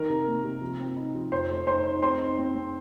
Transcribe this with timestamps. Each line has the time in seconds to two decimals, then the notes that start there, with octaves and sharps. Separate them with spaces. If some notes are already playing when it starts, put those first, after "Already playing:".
Already playing: D#3 A#4 A#5
0.09 C3
0.27 A#3
0.44 C3
0.61 F3
0.80 C4
0.96 D#4
1.15 F3
1.32 F2 C5 C6
1.50 A3
1.67 D#4 C5 C6
1.85 D#4
2.02 C4 C5 C6
2.19 D#4
2.38 C4
2.55 C4